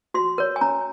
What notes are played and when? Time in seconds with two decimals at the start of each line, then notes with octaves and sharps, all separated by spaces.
0.14 F#4 C6
0.38 A#4 C#5
0.56 G#5
0.61 C#4 A#5